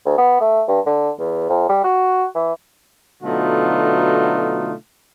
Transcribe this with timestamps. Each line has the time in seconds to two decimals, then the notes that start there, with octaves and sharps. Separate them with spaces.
0.05 D2
0.18 B3
0.41 A3
0.68 G2
0.86 D3
1.19 E2
1.49 F2
1.69 G3
1.84 F#4
2.35 E3
3.23 B2 D3 F#3 A3 D#4 F4